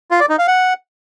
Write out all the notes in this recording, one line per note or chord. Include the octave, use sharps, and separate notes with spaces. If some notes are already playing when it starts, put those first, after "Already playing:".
F4
D5
D#4
F5
F#5